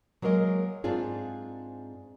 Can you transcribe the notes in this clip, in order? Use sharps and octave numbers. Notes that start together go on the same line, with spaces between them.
F#3 G#3 A#3 A#4 D#5
G#2 C4 D4 F4 G#4